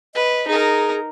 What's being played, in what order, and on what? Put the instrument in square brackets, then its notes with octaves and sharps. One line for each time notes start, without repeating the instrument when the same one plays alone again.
[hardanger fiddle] B4 [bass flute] D#5
[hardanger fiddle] D#4 A#4 [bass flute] G#4